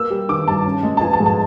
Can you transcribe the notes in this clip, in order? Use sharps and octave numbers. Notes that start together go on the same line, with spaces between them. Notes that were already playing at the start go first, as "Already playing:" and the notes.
Already playing: A#3 E6
G3
D#3 D6
G2 A5
C#4
G#3
A5
F3 G#5
A5
G#2
A5